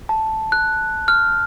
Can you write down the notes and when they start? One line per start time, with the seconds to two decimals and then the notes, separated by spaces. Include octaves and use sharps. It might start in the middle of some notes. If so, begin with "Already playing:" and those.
0.09 A5
0.52 F#6
1.08 F6